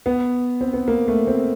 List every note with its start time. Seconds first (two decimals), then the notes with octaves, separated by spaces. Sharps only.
0.06 B3
0.61 C4
0.74 B3
0.88 A#3
1.08 A3
1.27 C4